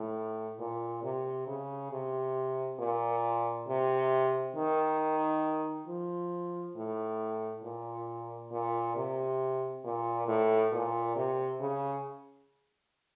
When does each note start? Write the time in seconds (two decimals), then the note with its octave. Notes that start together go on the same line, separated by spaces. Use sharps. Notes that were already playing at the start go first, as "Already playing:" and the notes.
Already playing: A2
0.59 A#2
1.03 C3
1.47 C#3
1.91 C3
2.79 A#2
3.68 C3
4.55 D#3
5.87 F3
6.76 A2
7.63 A#2
8.51 A#2
8.96 C3
9.84 A#2
10.28 A2
10.72 A#2
11.16 C3
11.60 C#3